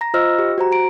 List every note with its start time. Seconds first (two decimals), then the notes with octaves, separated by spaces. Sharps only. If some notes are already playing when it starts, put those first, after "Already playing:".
0.01 A#5 A#6
0.14 F4 C5 D#5 E6 F6 A#6
0.39 G4
0.58 F#4 C5 A#5
0.72 A#5 D7